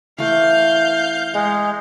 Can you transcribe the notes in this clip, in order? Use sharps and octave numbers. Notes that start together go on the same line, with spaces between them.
E3 A3 F5 G6
G#3 F#5